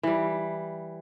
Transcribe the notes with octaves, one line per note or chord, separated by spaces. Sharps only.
E3 G3